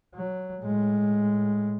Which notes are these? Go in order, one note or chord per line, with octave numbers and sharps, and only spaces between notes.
F#3
A2 G#3